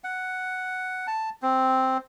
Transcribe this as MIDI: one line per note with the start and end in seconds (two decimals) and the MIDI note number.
0.04 1.07 78
1.07 1.30 81
1.42 1.97 60